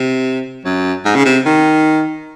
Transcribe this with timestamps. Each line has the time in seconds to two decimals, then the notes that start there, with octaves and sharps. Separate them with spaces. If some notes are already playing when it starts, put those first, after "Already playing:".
Already playing: C3
0.65 F#2
1.05 G#2
1.15 C#3
1.25 C3
1.46 D#3